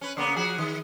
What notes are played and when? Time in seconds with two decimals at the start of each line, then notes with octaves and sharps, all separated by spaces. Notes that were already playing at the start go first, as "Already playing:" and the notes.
0.01 C#4 B4
0.17 C#3 A#3 B3
0.36 F3 F#4 G#4
0.58 D#3